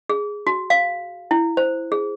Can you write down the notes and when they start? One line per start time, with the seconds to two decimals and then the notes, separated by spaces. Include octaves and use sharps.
0.10 G#4
0.47 F#4
0.70 F5
1.31 E4
1.57 C5
1.92 G#4